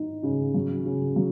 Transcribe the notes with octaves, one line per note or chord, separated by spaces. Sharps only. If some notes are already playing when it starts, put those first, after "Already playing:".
Already playing: D#4
C#3
F#3
C#3
F#3